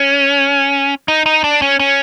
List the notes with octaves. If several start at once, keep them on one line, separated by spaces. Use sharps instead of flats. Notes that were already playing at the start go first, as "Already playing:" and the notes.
Already playing: C#4
D#4
D#4
D4
C#4
C#4